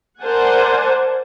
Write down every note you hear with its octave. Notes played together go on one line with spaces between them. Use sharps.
A#4 C5 D5 F#5 G#5 A5